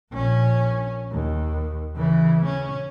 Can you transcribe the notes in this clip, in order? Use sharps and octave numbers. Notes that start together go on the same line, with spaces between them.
A#1 C#4
D#2
C#3 E3
C#4